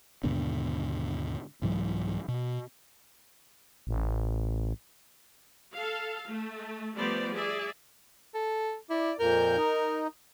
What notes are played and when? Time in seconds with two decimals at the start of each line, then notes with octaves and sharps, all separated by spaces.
0.24 D#2 G#2 B2 D3
1.62 C2 G#2 E3 F#3
2.28 B2
3.87 A1
5.74 A4 F5
6.30 A3
6.95 F3 G3 A3 B3 C5 D5
7.32 G#4 D5 E5
8.34 A4
8.90 E4 D5
9.20 F2 A#2 A#4 G6
9.58 D#4